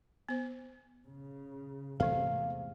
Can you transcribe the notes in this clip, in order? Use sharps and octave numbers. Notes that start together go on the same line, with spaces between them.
B3 C5
C#3
E2 G#2 C3 E3 A3 C4 A4 F5